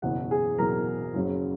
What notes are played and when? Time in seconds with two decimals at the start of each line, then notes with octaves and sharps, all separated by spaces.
0.02 F#1 E2 B2 F#3 F#4 F#5
0.31 G#4 G#5
0.58 F#1 E2 B2 F#3 A#4 A#5
1.14 F#1 F#2 C#3 F#3